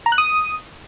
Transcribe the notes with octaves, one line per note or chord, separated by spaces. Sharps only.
A#5
F#6
D#6